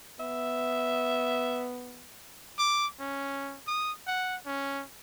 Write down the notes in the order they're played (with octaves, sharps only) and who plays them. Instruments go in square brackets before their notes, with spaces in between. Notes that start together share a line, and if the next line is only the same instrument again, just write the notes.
[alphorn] B3 [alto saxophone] E5
[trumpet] D6
C#4
D#6
F#5
C#4